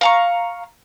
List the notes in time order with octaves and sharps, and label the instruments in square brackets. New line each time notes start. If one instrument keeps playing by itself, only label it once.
[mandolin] F5 A#5 C#6